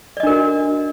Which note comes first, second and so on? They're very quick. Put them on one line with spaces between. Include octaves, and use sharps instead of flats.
D5 D#5 D4 A#4 F#4